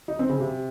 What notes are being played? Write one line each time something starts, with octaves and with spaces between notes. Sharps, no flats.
D#4
C4
C#3
C3